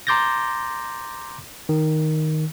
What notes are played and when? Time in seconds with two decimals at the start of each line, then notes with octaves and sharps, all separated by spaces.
0.07 A#5 C6 D6 G6 A6 A#6
1.69 D#3